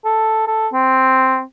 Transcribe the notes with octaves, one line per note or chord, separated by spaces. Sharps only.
A4
A4
C4